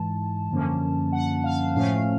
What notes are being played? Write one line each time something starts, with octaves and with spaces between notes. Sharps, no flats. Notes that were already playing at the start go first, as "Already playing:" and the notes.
Already playing: G#2 E3 G#3 A5
F#2 D3 F3 A#3 C#4
F#5
F5
A2 F3 A3 C#4 F5